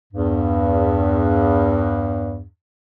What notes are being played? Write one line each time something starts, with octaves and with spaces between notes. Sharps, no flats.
E2 G2